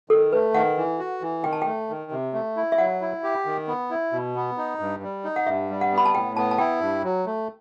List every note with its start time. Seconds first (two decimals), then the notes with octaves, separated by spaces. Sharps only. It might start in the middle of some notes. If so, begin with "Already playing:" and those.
0.09 D#3 A4
0.33 A3 B4
0.54 D#3 F#5
0.77 E3
0.99 F#4
1.22 E3
1.44 D#3 G5
1.53 A5
1.62 A3 G5
1.89 D#3
2.11 C3
2.33 A3
2.57 E4
2.72 E5
2.78 F#3 F#5
3.01 E4
3.24 G4
3.45 D#3
3.67 B3
3.91 E4
4.12 B2
4.36 B3
4.57 D#4
4.79 G2
5.02 G3
5.24 D#4
5.36 F#5
5.47 G2 E5
5.70 G3
5.81 F#5
5.92 B3
5.98 B5
6.05 A5
6.15 A2 G5
6.37 B3 A5
6.51 A5
6.58 E4 G5
6.81 G2
7.04 F#3
7.26 A3